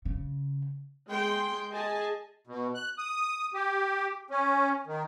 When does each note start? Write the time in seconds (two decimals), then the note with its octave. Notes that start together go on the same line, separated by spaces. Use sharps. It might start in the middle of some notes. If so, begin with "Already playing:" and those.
0.05 C#3
1.09 G#3 G5 C6
1.72 G#4 D#5 G#5 A5
2.47 B2
2.75 F#6
2.98 D#6
3.54 G4
4.31 C#4
4.87 D#3